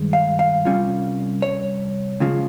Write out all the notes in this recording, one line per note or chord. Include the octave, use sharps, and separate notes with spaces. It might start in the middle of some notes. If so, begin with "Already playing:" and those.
Already playing: G2 D#3 G#3
F5
F5
C2 C3 G3 C#4 F4
C#5
C#2 C#3 F3